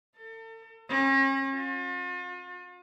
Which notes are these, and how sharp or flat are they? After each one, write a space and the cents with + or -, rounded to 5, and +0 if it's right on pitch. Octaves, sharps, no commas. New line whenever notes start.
A4 +40
C#4 -40
F4 +40